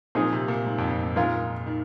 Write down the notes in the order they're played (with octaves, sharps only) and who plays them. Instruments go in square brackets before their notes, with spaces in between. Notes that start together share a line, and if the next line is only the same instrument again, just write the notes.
[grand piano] A#2 [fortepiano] F3 C4 D#4 G#4
[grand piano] C3
A#2
G#2
F2
F2
G#2
[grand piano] A#2 [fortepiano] D#3 G#3 F4 A#4
[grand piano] D#3